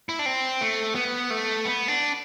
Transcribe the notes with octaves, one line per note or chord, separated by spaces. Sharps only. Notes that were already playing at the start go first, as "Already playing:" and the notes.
E4
D4
C4
A3
B3
A3
B3
D4